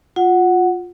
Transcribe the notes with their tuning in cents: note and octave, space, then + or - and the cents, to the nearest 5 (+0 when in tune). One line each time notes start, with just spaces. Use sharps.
F4 +20 F#5 +0